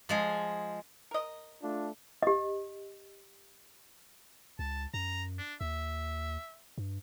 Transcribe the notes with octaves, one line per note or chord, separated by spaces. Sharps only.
F3 G#3 G#4
A#4 D#5
A3 D4 F4
G4 D#5
C#2 A5
F#2 A#5
D4
D#2 E5
G2